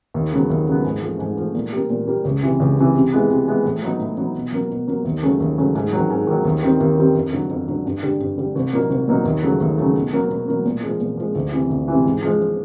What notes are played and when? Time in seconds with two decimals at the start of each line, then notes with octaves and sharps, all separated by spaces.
0.14 D#2
0.32 C#3 F#3 B3
0.50 D#2
0.67 C#3 F#3 B3
0.84 G#2
1.02 F3 A3
1.19 G#2
1.37 F3 A3
1.55 A#2
1.72 G3 A#3
1.90 A#2
2.07 G3 A#3
2.25 C#2
2.43 C3 E3
2.60 C#2
2.77 C3 E3
2.95 C3
3.12 E3 G#3 B3
3.29 C3
3.47 E3 G#3 B3
3.65 A2
3.82 F#3 B3 D#4
3.99 A2
4.18 F#3 B3 D#4
4.35 B2
4.52 F#3 A#3
4.70 B2
4.87 F#3 A#3
5.05 D#2
5.22 C#3 F#3 A3 C#4
5.40 D#2
5.58 C#3 F#3 A3 C#4
5.75 G#2
5.93 D#3 F#3
6.10 G#2
6.27 D#3 F#3
6.45 D#2
6.63 D#3 G3 C4
6.80 D#2
6.98 D#3 G3 C4
7.15 F2
7.32 D3 F#3
7.51 F2
7.68 D3 F#3
7.85 G2
8.03 D3 G3
8.20 G2
8.38 D3 G3
8.55 C2
8.73 A#2 F#3 A#3 D#4
8.90 C2
9.08 A#2 F#3 A#3 D#4
9.25 D#2
9.43 C#3 F#3 A3
9.61 D#2
9.78 C#3 F#3 A3
9.95 B2
10.13 F#3 A#3
10.30 B2
10.48 F#3 A#3
10.65 A#2
10.83 F3 G#3
11.00 A#2
11.17 F3 G#3
11.35 D2
11.53 C3 E3
11.70 D2
11.88 C3 E3
12.05 G#2
12.23 F3 G#3